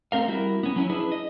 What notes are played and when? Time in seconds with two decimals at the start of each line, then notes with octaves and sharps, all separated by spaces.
0.12 A3 C4 A#4 F5
0.28 G3 E4 F#4 A#4 E5
0.63 B3 C#4
0.76 F#3 C#4 E4
0.90 D4 E4 G#4 B4
1.12 D#5